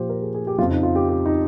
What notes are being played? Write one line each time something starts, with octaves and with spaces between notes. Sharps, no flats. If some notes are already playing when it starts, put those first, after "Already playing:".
Already playing: A#2 F3 G4 C5
A#4
G#4
G#4
G4
F2 C#3 F3 F4
D#4
F4
G4
G4
D#4